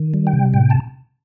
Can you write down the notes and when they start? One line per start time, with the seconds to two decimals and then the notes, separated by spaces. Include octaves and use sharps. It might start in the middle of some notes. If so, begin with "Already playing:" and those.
Already playing: D#3
0.14 G3
0.27 G5
0.33 C3
0.54 A2 G5
0.70 A5